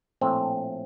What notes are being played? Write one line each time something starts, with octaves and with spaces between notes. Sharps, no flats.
A#1 A2 A3 C4